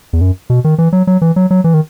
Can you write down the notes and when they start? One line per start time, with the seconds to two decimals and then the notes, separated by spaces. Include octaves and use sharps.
0.13 E2
0.21 F#2
0.50 B2
0.64 D#3
0.78 E3
0.93 F#3
1.07 F#3
1.22 E3
1.36 F#3
1.51 F#3
1.64 E3
1.74 D#3